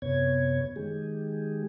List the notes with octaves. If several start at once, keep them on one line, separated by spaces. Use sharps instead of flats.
F#2 C3 B3 C#5 G#6
D#3 G#3 G4 G#4